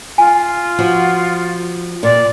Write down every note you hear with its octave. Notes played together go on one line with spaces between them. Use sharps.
F4 G#5
F3 F#4
A#2 D5